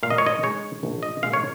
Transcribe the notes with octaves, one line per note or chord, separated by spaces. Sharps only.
A#2 F5
D#5
C#5
D#5
G#3 D#4 C#5
A#1
D#5
A#2 G#3 F5
C#5